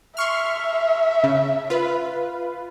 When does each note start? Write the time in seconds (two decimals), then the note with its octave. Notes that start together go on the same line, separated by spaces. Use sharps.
0.17 E5 C6 C#6 F6
1.24 C#3
1.70 F4 B4